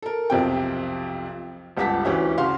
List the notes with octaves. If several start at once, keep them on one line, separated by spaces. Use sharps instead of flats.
A4 A#4
B1 F2 C3 G5
G1 C#2 G4 F#5 A5 B6
D2 E3 C#4 G4 E5
C#3 F#4 F5 C6